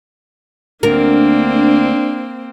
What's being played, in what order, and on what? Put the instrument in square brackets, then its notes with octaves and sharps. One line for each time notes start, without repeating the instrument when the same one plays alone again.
[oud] D2 A#4 [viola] A#3 C4 [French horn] D4